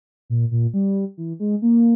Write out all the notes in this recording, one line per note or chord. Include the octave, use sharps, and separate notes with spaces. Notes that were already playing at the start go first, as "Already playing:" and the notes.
A#2
A#2
G3
E3
G#3
A#3